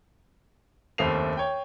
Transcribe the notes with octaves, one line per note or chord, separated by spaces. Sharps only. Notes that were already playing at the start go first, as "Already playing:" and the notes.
F#1 D#2 A3 C4 C7 F7
C#5 G5